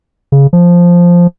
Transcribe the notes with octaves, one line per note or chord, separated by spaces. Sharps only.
C#3
F3